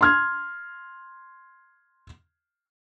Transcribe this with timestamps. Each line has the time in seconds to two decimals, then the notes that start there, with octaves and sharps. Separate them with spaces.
0.01 C6 F6 G#6